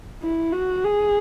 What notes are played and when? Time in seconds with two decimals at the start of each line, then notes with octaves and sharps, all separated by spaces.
0.23 E4
0.52 F#4
0.84 G#4